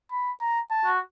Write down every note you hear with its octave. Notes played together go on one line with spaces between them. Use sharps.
B5
A#5
A5
F#4